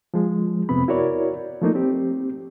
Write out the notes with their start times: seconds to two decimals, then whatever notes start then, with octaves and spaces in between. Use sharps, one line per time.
0.14 F3 G#3
0.69 F2 C3 B3 C4 B5
0.88 E4 F#4 A#4 C#5 D5
1.62 F3 A3 A#3 D#4
1.75 C4 G4